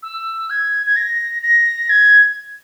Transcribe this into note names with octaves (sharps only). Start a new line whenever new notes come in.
E6
G#6
G#6
A#6
A#6
G#6